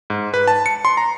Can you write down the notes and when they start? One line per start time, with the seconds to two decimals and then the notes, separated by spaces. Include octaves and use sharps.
0.10 G#2
0.34 B4
0.48 A5
0.66 C#7
0.85 C6
0.97 A#5